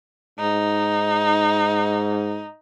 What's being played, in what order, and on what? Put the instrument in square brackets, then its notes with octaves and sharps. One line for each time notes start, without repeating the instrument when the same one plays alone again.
[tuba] G#2 [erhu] D#4